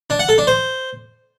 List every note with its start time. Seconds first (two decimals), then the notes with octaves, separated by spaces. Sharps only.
0.10 D4
0.19 F#5
0.29 A4
0.38 D4
0.47 C5